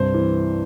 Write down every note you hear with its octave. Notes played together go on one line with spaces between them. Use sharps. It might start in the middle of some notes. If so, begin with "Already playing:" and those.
Already playing: C2 G2 C5
E3